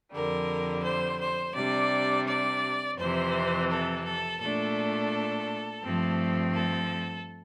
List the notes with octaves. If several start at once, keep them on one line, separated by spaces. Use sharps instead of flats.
F2 D3 G3 A#4
C5
C5
C3 G3 D4 D5
D5
F2 C3 E3 C5
A4
A4
A#2 A3 D4 A4
G2 F3 A3 C4
A4